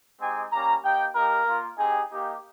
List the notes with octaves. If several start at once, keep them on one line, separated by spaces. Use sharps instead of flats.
G#3 C4 D#4 G4 G#5
G3 A#3 C#4 G4 A#5
A#3 D#4 G4 G5
A#3 D#4 G4 A#4
A#3 F4
C4 D#4 G4 G#4
A#3 D#4 G4